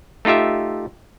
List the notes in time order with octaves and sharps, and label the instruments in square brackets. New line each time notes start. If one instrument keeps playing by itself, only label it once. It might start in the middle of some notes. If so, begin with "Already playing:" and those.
[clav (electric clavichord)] A3 D#4 F4 G4 E5